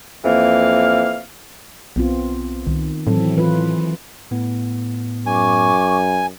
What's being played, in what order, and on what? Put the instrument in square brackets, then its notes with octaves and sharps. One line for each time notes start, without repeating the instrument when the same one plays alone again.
[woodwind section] F2 E3 A#3 F5
[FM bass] B1 [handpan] B3 C4 F4
[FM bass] C2 [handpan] D#3
[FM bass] A2 [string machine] E3 [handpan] F#3 C4 A4
[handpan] F4 B4
[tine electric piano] A2 B3
[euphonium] F#2 [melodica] G#5 [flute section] C#6 D6